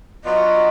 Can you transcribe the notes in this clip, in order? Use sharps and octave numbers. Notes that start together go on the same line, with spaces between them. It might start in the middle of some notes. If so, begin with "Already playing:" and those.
F#3 B3 D4 F4 D#5